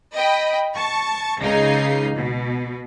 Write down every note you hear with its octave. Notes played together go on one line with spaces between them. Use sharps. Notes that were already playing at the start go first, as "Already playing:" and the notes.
D#5 G5 B5
A5 C#6
C#2 C#3 D#4 C7
B2